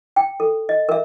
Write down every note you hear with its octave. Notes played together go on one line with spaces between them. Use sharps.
G5
A4
D#5
A#4 E5